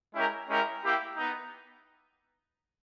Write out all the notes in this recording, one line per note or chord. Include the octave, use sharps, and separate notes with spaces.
G#3 C#4 E4 G4 A#4
G#3 C#4 E4 G4 A#4
A#3 E4 G4
B3 D#4